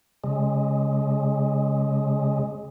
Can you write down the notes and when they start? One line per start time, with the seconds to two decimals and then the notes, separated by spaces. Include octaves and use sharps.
0.24 C#3 G#3